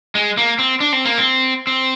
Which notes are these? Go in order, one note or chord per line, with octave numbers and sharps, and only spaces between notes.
G#3
A#3
C4
D4
C4
A#3
C4
C4